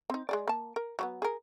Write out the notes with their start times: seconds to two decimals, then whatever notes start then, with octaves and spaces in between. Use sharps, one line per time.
0.10 C4 D#4
0.29 G#3 G#4 D5
0.48 A#3 A5
0.76 A#4
0.99 F#3 G3 B3
1.22 G#4 A#4